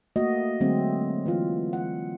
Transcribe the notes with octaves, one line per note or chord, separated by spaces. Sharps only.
A3 A#3 F#4 D#5
D3 F#3 G#3 A3 C4
E3 F4
F#5